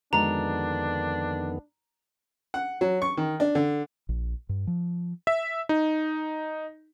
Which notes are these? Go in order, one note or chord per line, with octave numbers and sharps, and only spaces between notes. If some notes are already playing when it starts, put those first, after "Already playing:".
F2 D3 D#3 G#3 B3 D4 F#4 A#5
F#5
F#3
C#6
D#3
D4
D3
A#1
G2
F3
E5
D#4